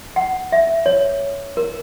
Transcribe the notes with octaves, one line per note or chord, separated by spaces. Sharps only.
F#5
E5
C#5
A#4